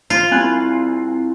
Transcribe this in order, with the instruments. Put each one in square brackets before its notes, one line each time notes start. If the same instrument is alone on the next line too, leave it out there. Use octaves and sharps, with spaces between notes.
[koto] F4
[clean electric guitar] C4 E4 B5 [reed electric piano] G#5 F#6